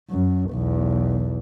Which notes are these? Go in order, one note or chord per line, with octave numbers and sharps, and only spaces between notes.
F#2
B1 E2